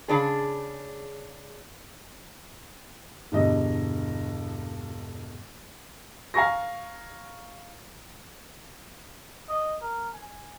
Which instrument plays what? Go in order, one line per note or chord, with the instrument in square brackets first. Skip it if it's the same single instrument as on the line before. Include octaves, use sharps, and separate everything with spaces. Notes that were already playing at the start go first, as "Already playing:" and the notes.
[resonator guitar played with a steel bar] C#3 D4 G#4
[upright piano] E1 G2 D3 D#5
F5 G#5 A#5 C#6 A#6
[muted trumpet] D#5
A#4
G#5